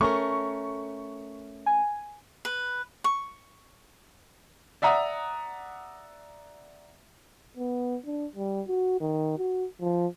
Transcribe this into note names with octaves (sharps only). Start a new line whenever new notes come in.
A3 C#4 A#4 C#6
G#5
B4
C#6
D5 E5 F#5 A#5 D#6
B3
D4
G3
F#4
D#3
F#4
F3